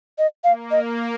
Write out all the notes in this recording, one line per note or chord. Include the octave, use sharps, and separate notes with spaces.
D#5
A#3 F5
D#5